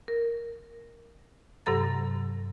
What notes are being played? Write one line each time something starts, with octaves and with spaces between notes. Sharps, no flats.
A#4
G2 C3 F#3 A4 A#5 A6